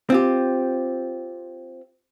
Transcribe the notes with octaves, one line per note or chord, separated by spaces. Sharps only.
C4 F4 G4